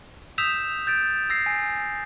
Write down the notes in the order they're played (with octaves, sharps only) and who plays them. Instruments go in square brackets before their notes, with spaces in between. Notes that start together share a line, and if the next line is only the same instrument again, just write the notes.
[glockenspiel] D#6 E6 G6 B6 E7 F7
G6 A6 D7
E6 A#6 C7
G#5